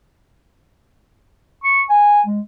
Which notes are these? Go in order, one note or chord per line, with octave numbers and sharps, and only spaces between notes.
C#6
G#5
G#3